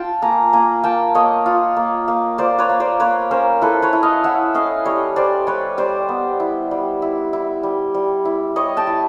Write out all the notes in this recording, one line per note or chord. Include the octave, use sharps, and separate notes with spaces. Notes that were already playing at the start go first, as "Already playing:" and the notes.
Already playing: F4 G5 A5
A#3 G#5 A#5
A#3 G#5 A#5
A#3 G5 A5
A#3 C#5 D#5
F4
A#3
A#3
A#3 C5 D5
B4 C#5
A#3
C5 D5
A#3 B4 C#5
C#4 A#4 C5
E4 A4 B4
B4 C#5
E4
D#5 F5
E4 E5 F#5
C#4 D#5 F5
G3 C#5 D#5
G3 C5 D5
G3 B4 C#5
G3 C5 D5
B3
E4
G3
E4
E4
G3
G3
E4
G3 C#5 D#5
G5 A5
E4